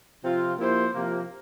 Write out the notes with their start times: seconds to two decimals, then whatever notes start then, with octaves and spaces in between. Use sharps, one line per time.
0.24 C3 F3 C4 F4
0.59 F3 A#3 E4 G4 C5
0.93 C3 F3 A#3